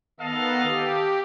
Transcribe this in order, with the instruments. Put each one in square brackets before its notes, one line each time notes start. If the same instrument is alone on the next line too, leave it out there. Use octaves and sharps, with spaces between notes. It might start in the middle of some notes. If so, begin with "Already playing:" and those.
[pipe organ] D#3 B3 [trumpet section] A4 D#5 F5
[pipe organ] G4